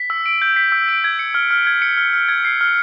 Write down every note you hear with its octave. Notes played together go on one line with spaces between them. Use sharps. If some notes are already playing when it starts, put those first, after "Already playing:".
Already playing: B6
E6
D7
G6
B6
E6
D7
G#6
C#7
F6
F6
G#6
C#7
F6
F6
G#6
C7
F6